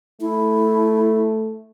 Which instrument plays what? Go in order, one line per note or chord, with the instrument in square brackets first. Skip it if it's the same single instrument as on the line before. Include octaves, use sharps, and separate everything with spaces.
[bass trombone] A3 [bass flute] E4